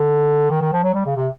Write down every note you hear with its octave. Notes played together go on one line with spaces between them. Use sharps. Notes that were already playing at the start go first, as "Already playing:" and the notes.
Already playing: D3
D#3
D#3
F3
F#3
G3
C#3
C3